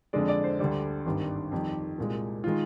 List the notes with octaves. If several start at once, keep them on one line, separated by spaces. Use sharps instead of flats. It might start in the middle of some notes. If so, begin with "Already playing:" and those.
F2 D3 G#3 D5
D5
C5
D2 D3 G3 D5
G#1 G2 D#3 G3
F2 D#3 G3 G4
C2 A#2 G#3
D#3 G#3 F4